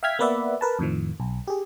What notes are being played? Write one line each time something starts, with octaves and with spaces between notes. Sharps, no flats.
E5 F5 G5 F6 G#6 B6
A#3 B3 B4 D5 E5 F#5
A#4 B4 A5
F2 A2 D#3 F3
B1
G4 G#4